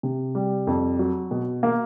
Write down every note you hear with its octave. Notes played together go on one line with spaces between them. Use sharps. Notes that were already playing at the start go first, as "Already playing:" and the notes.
C3
G3
F2
F#3
B2
A#3